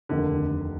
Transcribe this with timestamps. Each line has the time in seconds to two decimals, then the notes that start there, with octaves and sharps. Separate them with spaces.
0.09 F1 D#2 D3 D#3